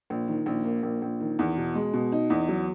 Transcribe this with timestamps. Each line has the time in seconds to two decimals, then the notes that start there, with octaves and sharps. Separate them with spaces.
0.10 A#1
0.28 D#3
0.46 A#1
0.65 A#3
0.83 A#1
1.02 A#1
1.20 D#3
1.39 E2
1.57 B2
1.75 G#3
1.93 B2
2.12 D#4
2.30 E2
2.49 F#3